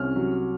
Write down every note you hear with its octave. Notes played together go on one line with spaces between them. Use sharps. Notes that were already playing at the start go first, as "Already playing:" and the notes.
Already playing: C2 C#4 F6
F#3